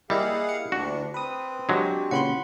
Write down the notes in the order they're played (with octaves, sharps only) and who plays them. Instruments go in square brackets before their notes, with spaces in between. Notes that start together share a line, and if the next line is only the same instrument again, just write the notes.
[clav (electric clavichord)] G3 [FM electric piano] A#3 E4 G4 [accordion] G#4 F5 F#5 [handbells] D#5
[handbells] C#7
[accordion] D2 D4 [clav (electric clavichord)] F#4
[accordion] C4 [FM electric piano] B4 D#6
[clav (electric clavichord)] F#3 G#3 [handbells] D4 F#4 G4
[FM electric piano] A#2 C#3 E3 [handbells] F#5 B5 C6